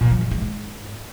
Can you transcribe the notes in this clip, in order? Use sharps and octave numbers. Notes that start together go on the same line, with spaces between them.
A#2
F3
E3
G#3
G#2